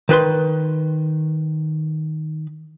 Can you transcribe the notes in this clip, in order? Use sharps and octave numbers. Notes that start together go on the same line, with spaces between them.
D#3 B4 C6